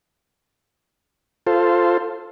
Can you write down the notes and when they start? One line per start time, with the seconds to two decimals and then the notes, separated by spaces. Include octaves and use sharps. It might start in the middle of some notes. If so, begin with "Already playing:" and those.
1.47 F4 A4 C5